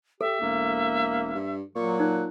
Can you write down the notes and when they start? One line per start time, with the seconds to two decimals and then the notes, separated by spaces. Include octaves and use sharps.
0.21 G4 A4 E5
0.41 E1 A#3
1.35 G2
1.75 A#2 F#3 C#6
2.00 D#4 F#6